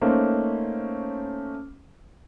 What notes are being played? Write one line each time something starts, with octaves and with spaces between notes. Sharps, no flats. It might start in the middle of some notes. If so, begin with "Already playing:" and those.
A3 A#3 C#4 D#4 C5